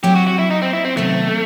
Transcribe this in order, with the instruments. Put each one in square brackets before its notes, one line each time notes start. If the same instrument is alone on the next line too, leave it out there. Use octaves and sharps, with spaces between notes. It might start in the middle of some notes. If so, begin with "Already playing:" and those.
[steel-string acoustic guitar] F#3 C4 E4 [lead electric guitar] G4
[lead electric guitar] F#4
F#4
E4
D#4
C4
E4
C4
[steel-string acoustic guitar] C3 D#3 F#3 B3 [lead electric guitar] A3